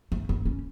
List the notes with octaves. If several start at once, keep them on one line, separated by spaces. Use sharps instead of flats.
A3
B3
C#4